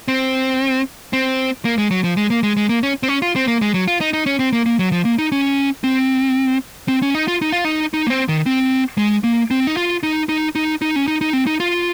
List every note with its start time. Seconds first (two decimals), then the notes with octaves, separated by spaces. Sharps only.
0.08 C4
1.13 C4
1.65 A#3
1.78 G#3
1.91 F#3
2.04 F3
2.17 G#3
2.30 A#3
2.43 G#3
2.57 G#3
2.69 A#3
2.83 C#4
3.03 C4
3.08 C#4
3.22 F4
3.36 C4
3.48 A#3
3.62 G#3
3.74 F#3
3.88 F4
4.01 D#4
4.13 D#4
4.26 C#4
4.39 C4
4.53 A#3
4.66 A#3
4.79 F#3
4.92 F3
5.05 A#3
5.18 D#4
5.32 C#4
5.84 C4
6.88 C4
7.02 C#4
7.15 D#4
7.28 F4
7.42 D#4
7.52 F4
7.65 D#4
7.94 D#4
8.06 A#3
8.10 C4
8.28 D#3
8.46 C4
8.98 G#3
9.24 A#3
9.51 C4
9.67 D#4
9.77 F4
10.03 D#4
10.29 D#4
10.55 D#4
10.82 D#4
10.96 C#4
11.08 D#4
11.21 D#4
11.33 C4
11.47 D#4
11.60 F4